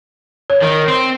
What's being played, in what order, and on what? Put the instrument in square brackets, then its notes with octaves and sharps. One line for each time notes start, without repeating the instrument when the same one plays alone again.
[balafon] C#5
[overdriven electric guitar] D#3
C4